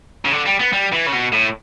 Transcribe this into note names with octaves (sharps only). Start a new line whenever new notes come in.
C#3
D3
G3
B3
G3
E3
C#3
B2
A2